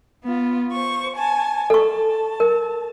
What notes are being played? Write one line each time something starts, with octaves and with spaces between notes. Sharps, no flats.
B3 F4
C5 C#6
G#5 A5
A4 A5 C#6
A#4